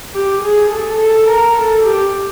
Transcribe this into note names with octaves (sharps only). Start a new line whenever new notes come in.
G4
G#4
A4
A4
A#4
A4
G4